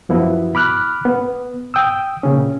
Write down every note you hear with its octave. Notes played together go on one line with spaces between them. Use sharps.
F#2 F3 B3 E4 F#4
B5 D6 F6 F#6
B3
G5 D#6 E6
A#2 C#3 C#4